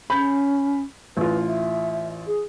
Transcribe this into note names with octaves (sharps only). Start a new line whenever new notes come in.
C#4 B5 G6
A1 F4 B4
E5
G#4